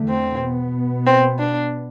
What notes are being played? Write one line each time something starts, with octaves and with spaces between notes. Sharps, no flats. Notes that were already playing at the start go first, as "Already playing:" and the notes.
Already playing: E2 D3 A3
C4
B2 B3
C4
D4